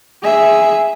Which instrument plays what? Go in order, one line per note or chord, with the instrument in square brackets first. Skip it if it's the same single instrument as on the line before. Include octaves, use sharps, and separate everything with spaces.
[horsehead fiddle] G#4 E5